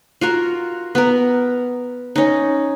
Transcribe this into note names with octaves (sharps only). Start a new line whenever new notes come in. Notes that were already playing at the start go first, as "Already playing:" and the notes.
F4 F#4 A#4
B3 A#4
C#4 D#4